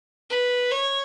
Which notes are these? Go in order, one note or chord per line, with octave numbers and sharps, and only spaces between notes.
B4
C#5